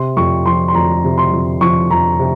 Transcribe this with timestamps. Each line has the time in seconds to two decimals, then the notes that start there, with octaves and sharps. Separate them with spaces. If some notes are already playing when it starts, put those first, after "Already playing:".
Already playing: C3 C6
0.17 F2 C#6
0.46 F3 C6
0.68 C6
0.75 F2 A#5
1.04 C3
1.18 C6
1.33 F2
1.61 F3 C#6
1.90 F2 A#5
2.19 C3